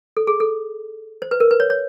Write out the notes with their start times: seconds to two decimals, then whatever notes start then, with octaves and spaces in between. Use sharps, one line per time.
0.17 A4
0.27 G#4
0.40 A4
1.22 C5
1.31 B4
1.40 A#4
1.51 B4
1.60 C#5
1.70 C#5